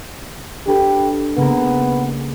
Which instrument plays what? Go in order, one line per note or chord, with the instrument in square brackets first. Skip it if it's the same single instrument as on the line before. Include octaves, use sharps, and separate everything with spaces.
[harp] D4 A4 B4 [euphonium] G4
[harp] C#3 G#3 A#3 [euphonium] B3